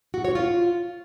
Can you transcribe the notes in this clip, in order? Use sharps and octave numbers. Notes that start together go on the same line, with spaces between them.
F#4
C#5
F4